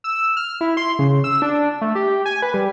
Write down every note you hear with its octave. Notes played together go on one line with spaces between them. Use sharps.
E6
F6
E4
C6
C#3
E6
D4
A3
G4
G#5
B4
G3